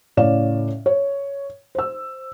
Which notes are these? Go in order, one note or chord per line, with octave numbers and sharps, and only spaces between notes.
A2 C#3 C#5 D5 F5 E7
C#5
C5 E6